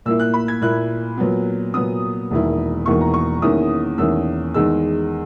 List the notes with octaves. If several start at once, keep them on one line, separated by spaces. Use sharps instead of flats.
A#2 A#3 E4 E6
F#6
B5
G#6
A#2 A#3 E4 F#6
A#2 F#3 B3
A#2 F#3 B3 D#6
E1 E2 D#3 A#3 E4
E1 E2 D#3 A#3 E4 C#6
A#5
C#6
E2 D#3 A#3 C#4 E4 D#6
E2 D#3 A#3 C#4 E4 E6
E2 D#3 G#3 D#4 E6